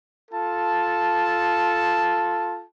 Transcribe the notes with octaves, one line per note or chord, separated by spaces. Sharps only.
F4 A4 A5